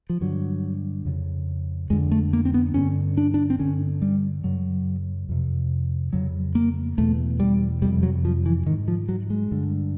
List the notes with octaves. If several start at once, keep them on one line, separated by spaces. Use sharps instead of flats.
F3
G2 D3 F#3
F2 C#3
F2 D3 G#3
A3
A#3
C4
B3
G2 D3 C#4
D4
D4
C4
G2 D3 C#4
G3
F#2 C#3 F#3
F2 C3
F2 C#3 F#3
A#3
E2 B2 A3
G3
F2 C3 G3
F#3
F3
E3
G#2 D#3
F3
F#3
G#3
G2 D3